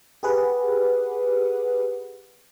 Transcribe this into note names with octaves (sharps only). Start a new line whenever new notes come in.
G4 G#4 B4 F#5